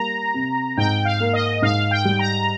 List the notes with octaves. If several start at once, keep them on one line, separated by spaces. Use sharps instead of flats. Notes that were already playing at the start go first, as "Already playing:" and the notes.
Already playing: G3 A#3 A#5
C3
G#2 G5
F5
A#3
D#5
G#2 F5
G5
G3
A#5